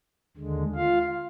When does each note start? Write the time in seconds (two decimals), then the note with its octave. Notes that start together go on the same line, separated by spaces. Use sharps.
0.37 D#2 D3 G#3
0.75 F4 F5